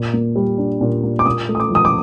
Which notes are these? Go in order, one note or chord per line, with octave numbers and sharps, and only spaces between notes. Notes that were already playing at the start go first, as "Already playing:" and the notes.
Already playing: A#2
A#3
G3
D4
A#2
A#3
D6
A#2 D#6
A3
D#6
D6
F3 D#6
D6